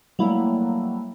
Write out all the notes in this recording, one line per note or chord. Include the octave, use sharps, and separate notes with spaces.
F#3 G3 A3 A#3 E4